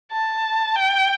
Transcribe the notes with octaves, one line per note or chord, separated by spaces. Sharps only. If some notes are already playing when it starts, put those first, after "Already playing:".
A5
G5